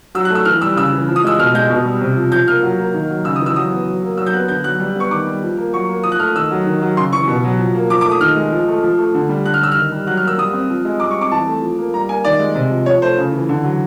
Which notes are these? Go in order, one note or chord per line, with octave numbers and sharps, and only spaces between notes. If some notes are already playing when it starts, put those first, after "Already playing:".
F#3 E6
F#6
A3
E6
E3 F6
G3 E6
C#3 E6
E3
F3
D#6
G#3 E6
B2 F6
G#3 G6
B2
G3
C3
F3
F3 G6
A#3 F6
F#3
A#3
D#3
F#3
C#3 E6
D#6
E3
E6
F#3 D#6
B3
F#3
A#3
F#3 E6
G6
B3 F#6
D3 G6
F#3 F#6
G3
B3 C#6
D#3 D6
G3
F3
A#3
F#3 C#6
A#3
F3 D#6
F#6
A3 F6
D#3 E6
F#3
D#3
F#3
C#3 C6
E3 C#6
B2
F#3
F3
A#3
F3 D6
D6
A3
D#6
D#3 F6
G#3
F3
A3
F3
A3
D3
G3
D3 F#6
F6
G3 E6
F6
D#3
G3
F#3 F#6
F6
A#3 E6
G3 D#6
C4
F3
G#3
G3 D6
C#6
C4
D6
E3 A5
A3
F3
A#3
G3 A#5
A#3 G#5
D#3 D5
G#3
C3
F3
F3 C#5
A3 C5
C#3
E3
D3
F#3